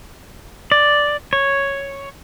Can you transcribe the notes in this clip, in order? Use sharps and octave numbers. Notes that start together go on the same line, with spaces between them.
D5
C#5